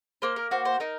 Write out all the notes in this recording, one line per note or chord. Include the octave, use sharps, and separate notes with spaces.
A#3 C5
A#4
F#4 C5
C5
D#4 A#4